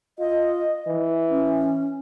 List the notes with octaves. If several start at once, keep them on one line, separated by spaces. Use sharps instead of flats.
F4 D#5
E3
C#4